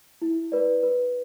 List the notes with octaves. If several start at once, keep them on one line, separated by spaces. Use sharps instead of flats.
E4
B4 D5
B4